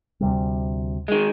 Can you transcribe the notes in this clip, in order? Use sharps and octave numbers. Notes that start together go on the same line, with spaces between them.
D2 C3 G3
D#3 G#3